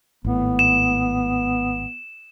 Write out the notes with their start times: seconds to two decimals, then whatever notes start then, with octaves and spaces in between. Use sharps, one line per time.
0.25 G#1 A2 B3
0.59 E7